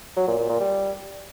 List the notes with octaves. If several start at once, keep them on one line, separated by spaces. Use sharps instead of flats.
F#3
A#2
A#2
A#2
G3